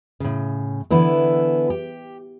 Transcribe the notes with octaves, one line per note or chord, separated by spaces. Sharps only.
A2 C#3
D3 E3 B3 E4
G4